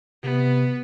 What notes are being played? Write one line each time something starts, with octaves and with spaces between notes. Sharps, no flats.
C3 B3